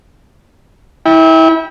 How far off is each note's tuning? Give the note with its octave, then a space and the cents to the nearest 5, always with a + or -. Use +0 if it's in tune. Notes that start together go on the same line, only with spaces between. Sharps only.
E4 -30 G5 +20